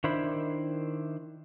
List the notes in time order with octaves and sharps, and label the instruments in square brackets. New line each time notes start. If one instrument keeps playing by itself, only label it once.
[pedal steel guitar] D#3 D4 E4 C5 B5